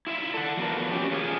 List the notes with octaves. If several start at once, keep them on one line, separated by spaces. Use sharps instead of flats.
E4 F4 E5
A4 F#5
F3 A3 B3 F#4 A#4
C#4 G4
A3 F4 G#4